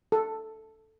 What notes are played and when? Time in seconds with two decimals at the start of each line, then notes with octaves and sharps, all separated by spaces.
0.12 A4